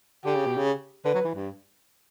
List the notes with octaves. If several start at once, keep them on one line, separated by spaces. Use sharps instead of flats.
D3 G4
C#3
B2
C#3
D3 B4
F#3
E3
G2